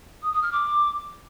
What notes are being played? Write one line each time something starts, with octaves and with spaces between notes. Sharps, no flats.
D#6
D#6
F6
D6